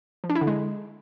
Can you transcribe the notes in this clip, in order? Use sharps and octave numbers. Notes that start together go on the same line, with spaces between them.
F3
D4
E4
D3
G#3